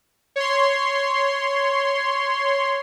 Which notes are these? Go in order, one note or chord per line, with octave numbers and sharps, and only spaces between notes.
C#5 C6